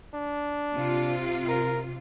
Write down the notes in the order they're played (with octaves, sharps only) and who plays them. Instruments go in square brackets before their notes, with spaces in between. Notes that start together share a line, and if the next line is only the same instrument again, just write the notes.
[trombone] D4
[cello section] C3 F4
[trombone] A#4